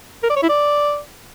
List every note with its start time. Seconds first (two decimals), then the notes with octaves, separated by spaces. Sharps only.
0.23 A#4
0.30 D5
0.36 C#5
0.43 E4
0.49 D5